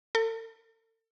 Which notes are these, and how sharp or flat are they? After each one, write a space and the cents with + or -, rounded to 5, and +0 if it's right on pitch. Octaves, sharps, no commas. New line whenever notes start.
A4 +40